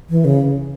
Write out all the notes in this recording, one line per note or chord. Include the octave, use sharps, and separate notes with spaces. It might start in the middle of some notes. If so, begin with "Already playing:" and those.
E3
C#3